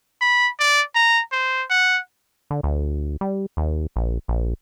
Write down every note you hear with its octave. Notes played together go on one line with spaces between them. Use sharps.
B5
D5
A#5
C5
F#5
D3
D2
G3
D#2
A#1
A#1